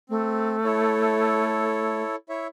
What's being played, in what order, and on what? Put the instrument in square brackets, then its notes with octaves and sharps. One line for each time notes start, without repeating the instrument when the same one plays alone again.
[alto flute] A3 [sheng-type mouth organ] C4
[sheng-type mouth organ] E4 A4 C#5
E4 C#5 E5